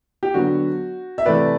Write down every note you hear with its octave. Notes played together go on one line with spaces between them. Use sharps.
G4
D3 F#3 B3 F#4
E5
C3 E3 A3 B4 D5